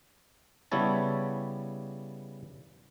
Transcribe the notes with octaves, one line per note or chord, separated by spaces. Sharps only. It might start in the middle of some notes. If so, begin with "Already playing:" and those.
C#3 G3 B3 E4 C#5 A5